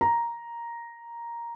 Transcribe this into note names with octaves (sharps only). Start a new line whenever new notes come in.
A#5